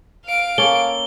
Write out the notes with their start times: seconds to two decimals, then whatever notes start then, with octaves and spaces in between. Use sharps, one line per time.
0.25 F5 D7
0.58 A#3 C#4 A4 G7